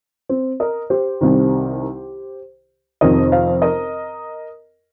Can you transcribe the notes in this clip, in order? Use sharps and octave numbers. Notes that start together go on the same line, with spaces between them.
C4
A#4 D#5
G4 C5
C2 C3 D#3
F1 F2 C3 D#3 A#4 D#5
C5 F5
A#4 D#5